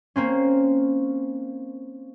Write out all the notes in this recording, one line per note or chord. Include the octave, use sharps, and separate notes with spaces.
A#3 C4 C#4